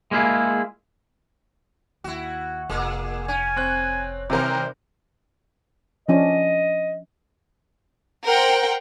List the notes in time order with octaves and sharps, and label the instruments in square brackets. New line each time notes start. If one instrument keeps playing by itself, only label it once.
[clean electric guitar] G#3 A#3 E4 F4 G#4
[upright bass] D#2 [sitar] E4 F#4
[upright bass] F1 [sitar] A#2 A#3 G#4
[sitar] C#4 [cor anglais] G#5
[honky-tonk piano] C4 F#6
[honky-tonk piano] C3 C4 A#4 [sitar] D#3 G3 [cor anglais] C5
[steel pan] F3 C#4 D4 [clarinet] D#5
[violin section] A#4 C5 F#5 G5